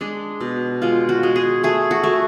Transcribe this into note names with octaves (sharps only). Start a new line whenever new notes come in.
G#3 D4
B2
G#3 F4
F#4
G#3
G#4
A3 G#4
F#4
A3